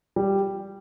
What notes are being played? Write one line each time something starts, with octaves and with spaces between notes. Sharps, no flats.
G3